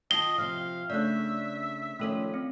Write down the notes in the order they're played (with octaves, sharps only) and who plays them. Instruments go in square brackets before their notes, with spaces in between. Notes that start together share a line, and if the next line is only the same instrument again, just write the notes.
[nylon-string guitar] D#3 F4 A5 [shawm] D#5 [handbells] C7 [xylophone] G7
[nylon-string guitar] C3 F3 [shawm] F5
[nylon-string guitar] C#3 A3 D4 [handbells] D5 F#6 [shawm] E5
[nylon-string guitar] D#3 F3 C#4 [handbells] A3 A4
[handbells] C4